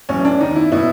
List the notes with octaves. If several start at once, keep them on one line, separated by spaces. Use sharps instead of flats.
B1 A2 E3 C#4
D4
D#2 D#3 D#4
E4
B2 E4